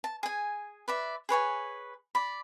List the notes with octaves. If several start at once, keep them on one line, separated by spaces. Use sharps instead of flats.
A5
G#4 G#5
B4 D5 E5
G#4 B4 C#5 G#5
D5 B5